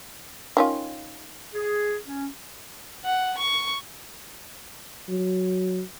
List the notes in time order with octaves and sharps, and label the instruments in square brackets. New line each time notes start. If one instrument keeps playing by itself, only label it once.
[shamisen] D#3 C#4 F4
[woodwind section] G#4
C#4
[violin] F#5
C#6
[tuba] F#3